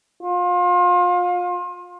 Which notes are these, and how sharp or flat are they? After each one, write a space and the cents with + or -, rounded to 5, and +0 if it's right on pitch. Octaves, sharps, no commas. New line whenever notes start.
F4 +30